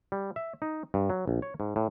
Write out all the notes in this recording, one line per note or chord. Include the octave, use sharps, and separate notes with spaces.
G3
E5
D#4
G2
F#3
A#1
C#5
G#2
A2